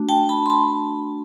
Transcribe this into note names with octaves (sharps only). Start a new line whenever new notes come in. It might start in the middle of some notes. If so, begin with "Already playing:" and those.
Already playing: A3 D4 F#4
G5 A5
A5 B5
C6
A5 B5